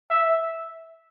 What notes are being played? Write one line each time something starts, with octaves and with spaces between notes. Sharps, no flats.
E5